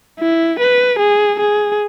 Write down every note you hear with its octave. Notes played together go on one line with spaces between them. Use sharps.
E4
B4
G#4
G#4